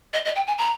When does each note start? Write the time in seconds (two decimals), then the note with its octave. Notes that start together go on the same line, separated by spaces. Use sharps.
0.13 D#5
0.25 D#5
0.36 G5
0.47 G#5
0.58 A#5